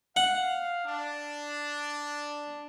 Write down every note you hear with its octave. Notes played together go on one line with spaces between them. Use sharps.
F5 F#5
D4